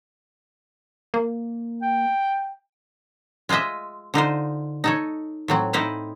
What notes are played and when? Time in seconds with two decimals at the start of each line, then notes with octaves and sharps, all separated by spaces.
1.14 A#3
1.82 G5
3.49 G#3 F4 C5 D#5 E5
4.14 D3 D#4 F4 C5
4.84 D#4 A4 C#5
5.48 A2 F#3 C4
5.73 D#4 E4 C5 F5